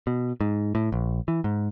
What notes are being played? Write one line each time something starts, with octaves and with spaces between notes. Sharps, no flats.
B2
G#2
A2
A#1
E3
G#2